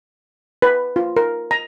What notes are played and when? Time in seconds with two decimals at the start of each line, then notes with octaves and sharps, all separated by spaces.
0.62 B4
0.96 F4
1.16 A#4
1.51 A#5